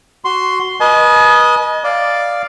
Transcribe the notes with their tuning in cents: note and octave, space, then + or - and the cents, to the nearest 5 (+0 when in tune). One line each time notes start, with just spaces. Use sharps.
F#4 +10 C6 +0
B4 -35 D#5 +0 G#5 +45
D5 +0 F5 +0